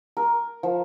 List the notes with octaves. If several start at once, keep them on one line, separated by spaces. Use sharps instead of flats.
A#4
F3